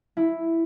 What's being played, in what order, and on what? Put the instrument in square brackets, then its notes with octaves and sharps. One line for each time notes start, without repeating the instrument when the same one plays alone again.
[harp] E4